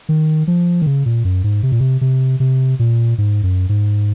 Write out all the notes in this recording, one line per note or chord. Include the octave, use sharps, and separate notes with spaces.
D#3
F3
D#3
C#3
A#2
F#2
G#2
C3
A#2
C3
C3
C3
A#2
G#2
F#2
G#2